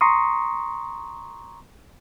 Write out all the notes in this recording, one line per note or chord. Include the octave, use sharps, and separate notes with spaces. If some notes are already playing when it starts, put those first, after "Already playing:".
A#5 C6 C#6 D#6